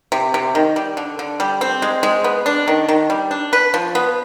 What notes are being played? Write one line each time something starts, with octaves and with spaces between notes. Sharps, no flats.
C3
C3
D#3
G3
D3
D3
G3
C4
G#3
G#3
B3
D4
D#3
D#3
G3
D4
B4
F3
B3